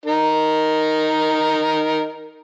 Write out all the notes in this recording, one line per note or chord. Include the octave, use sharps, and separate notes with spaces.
D#4 A#4